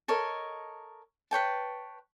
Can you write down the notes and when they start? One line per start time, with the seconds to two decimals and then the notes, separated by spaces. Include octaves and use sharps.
0.08 A4 A#4 C#5 D#5
1.31 B4 C#5 G5 A5